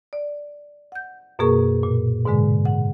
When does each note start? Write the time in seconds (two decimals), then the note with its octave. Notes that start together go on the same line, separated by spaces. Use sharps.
0.13 D5
0.92 F#5 G6
1.39 F#2 B2 A#3 G#4 A#4 C#6
1.83 A#2
2.25 G#2 B2 D3 G#3
2.66 F#5